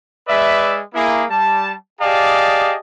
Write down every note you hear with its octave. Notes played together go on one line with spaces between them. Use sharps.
G#3 B4 D5 E5
A#3 E4 G#4
G3 A5
G4 G#4 D5 D#5 F5 A5